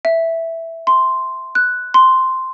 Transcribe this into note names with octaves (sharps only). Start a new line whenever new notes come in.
E5
C6
F#6
C6